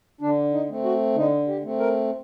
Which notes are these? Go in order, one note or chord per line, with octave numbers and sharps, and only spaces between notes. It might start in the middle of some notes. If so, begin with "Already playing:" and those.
D3 D4
D#4
A3 C4
F#4
D3 D#4
G4
A3 C4
A#4